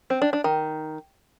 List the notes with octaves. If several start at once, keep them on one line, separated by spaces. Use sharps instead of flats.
C4
D4
D4
D#3